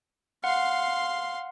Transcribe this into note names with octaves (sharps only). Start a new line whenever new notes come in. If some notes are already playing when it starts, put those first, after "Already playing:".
F5 F#5 C6